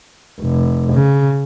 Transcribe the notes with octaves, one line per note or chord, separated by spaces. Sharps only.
F1
C#3